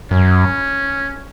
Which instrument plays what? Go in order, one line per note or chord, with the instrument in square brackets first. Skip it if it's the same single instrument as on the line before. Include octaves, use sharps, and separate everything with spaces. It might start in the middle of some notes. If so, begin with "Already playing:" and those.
[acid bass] F#2 [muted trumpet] C#4